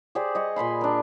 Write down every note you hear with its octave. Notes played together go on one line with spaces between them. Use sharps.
G4 G#4 C5 D5
D#5 G#5 C#6
A#2 G#5 B5 C6
D4 A#4